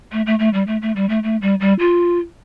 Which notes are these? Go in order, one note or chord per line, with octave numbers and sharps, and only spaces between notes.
A3
A3
A3
G3
A3
A3
G3
A3
A3
G3
G3
F4